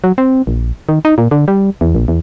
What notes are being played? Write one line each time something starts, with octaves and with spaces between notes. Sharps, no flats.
F#3
C4
A#1
D#3
D#4
A#2
D3
G3
E2
A#1
E2